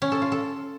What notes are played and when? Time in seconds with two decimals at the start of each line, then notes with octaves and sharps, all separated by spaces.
0.02 C#4
0.12 A4
0.22 F4
0.32 A4